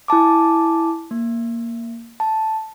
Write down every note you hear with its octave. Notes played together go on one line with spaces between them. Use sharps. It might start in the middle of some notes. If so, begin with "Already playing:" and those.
E4 G#5 A5 D6
A#3
A5